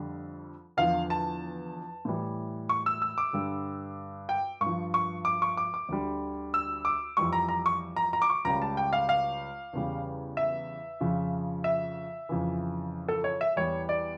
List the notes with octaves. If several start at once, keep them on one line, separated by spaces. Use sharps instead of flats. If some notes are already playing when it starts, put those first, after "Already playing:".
Already playing: F2 D3 G3
E2 D3 F3 F5
A5
A2 E3 G3
C#6
E6
E6
D6
G2 D3 G3
G5
G2 C#6
F3
C#6
D6
C#6
D6
D6
D2 D3 G3
E6
D6
F2 E3 G3 C#6
A#5
A#5
C#6
A#5
A#5
D6
C#6
C#2 C#3 G3 A#5
A5
G5
F5
F5
E2 C#3 G3
E5
F2 C#3 F3
E5
F2 C#3 E3
A4
C#5
E5
E2 E3 G3 C#5
D5